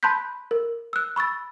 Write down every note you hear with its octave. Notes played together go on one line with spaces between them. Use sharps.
A5 B5 C6 F#6 G6 B6
A#4
E6 F#6
B5 C#6 E6 A6